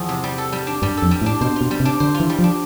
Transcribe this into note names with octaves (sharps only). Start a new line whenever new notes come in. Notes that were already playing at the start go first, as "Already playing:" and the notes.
Already playing: E2 F3
C3
G3
A4
G3
D4
G2 G3
F2 A4
G3
A2
D4
B2 C5
B2 F4
G3
C3
D4
D3 C5
F4
E3
G3
F3
D4